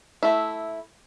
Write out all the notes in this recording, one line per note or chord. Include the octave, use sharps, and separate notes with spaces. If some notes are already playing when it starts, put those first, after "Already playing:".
A3 E4